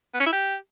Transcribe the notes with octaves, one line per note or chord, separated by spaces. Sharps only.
B3
C#4
E4
G4